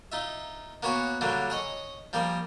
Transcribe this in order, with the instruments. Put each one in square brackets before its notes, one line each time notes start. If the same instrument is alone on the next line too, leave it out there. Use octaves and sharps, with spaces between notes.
[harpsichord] D#4 F4 E5
A#3 B3 F#4 C#5 G#5
D3 F#3 G3 A#3
G#4 C#5 D#5
F3 G3 A#3 G#4